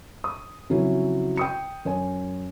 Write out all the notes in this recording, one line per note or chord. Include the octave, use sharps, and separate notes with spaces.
D#6
F2 C#3 F#3 C#4 E4
G5 D#6 C#7
F#2 C#5 G#5